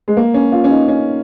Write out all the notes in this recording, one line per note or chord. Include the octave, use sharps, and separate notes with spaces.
G#3
A#3
C#4
F4
C#4
D#4
C#4